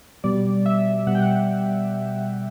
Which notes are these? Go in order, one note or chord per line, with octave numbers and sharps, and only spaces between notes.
B2 G3 D5
E5
B2 G3 F#5
G5
F#5